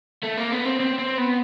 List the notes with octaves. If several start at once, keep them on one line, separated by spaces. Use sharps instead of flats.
A3
A#3
B3
C4
C4
C4
B3